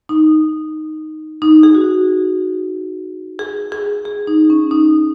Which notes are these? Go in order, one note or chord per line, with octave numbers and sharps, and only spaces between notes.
D#4
D#4
G#4
F#4
G#4
G#4
G#4
D#4
C#4
D#4